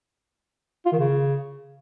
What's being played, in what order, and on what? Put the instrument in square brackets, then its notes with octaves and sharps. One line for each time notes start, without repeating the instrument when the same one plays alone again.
[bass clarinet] F4
D#3
C#3